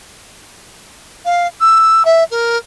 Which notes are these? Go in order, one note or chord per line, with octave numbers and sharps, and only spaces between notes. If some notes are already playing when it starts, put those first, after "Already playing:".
F5
E6
E5
A#4